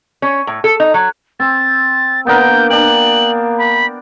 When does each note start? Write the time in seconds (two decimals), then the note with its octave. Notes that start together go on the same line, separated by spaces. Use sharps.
0.22 C#4
0.47 A2
0.64 A4
0.80 D#4
0.94 F#3
1.40 C4 A6
2.27 A#3 B3 D4 A#4 G6
2.70 D4 G5 F#7
3.58 B5